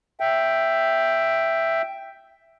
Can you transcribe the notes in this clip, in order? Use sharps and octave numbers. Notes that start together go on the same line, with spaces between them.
E5 G5